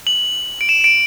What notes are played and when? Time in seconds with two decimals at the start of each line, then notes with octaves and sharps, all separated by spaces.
0.07 F#7
0.61 D7
0.69 E7
0.84 D7